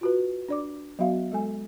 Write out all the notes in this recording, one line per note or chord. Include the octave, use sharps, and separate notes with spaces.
F4 F#4 B4
D4 D5 D6
F#3 B3 F#4 E5 F5
G#3 A4 G#5